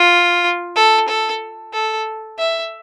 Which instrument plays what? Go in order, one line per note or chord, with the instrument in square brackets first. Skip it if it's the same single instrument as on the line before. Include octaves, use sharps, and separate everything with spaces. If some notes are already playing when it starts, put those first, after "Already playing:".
Already playing: [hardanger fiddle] F4
A4
A4
A4
E5